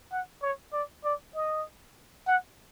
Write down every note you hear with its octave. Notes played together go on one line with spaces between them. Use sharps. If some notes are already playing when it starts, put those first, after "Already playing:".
F#5
C#5
D5
D5
D#5
F#5